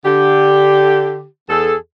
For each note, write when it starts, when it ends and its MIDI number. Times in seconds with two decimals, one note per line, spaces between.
0.04 1.25 50
0.04 1.25 67
1.49 1.75 40
1.49 1.75 68
1.49 1.75 69